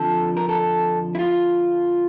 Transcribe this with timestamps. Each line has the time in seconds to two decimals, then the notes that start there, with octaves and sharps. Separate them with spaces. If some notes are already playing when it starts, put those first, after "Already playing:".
Already playing: F2 D3 F3 A4
0.37 A#4
0.49 A4
1.15 E4
1.19 F4